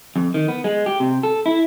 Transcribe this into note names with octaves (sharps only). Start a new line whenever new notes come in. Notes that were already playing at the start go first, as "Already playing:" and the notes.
F2
D#3
B3
G#3
G4
C3
A4
E4